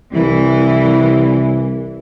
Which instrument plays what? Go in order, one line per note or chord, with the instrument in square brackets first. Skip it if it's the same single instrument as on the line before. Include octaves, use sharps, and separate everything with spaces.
[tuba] C2 [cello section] E3